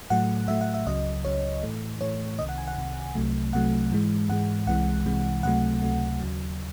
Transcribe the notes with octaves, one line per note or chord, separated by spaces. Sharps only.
A2 F#3 A3 F#5
A2 F#3 A3 E5
F#5
E5
C#2 C#3 F#3 D#5
C#2 C#3 F#3 C#5
A2 E3 A3
A2 E3 A3 C#5
C2 C3 D#3 D#5
F#5
G#5
F#5
C2 C3 D#3
C2 C3 F#3 A3
C2 C3 F#3 A3 F#5
G#2 E3 G#3
G#2 E3 G#3 F#5
C2 C3 E3 G#3 F#5
C2 C3 E3 G#3
C#2 C3 F#3 A3 F#5
C#2 C3 F#3 A3
D#2 C#3 F#3